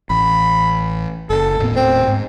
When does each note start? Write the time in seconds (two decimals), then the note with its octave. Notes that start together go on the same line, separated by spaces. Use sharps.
0.10 A1 B5
1.30 F#1 A4
1.59 D#1 A2 B3
1.76 C4
2.08 G#2